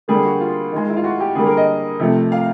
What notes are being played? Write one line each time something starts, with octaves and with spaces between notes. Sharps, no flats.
D3 G3 A#3 G#4
F#4
F4
D#3 G#3
E4
F4
F#4
G4
D3 G3 A#3 G#4
A#4
D#5
C3 F3 A3
F5